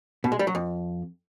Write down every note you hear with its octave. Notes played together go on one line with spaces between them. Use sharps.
B2
G#3
G3
F#3
F2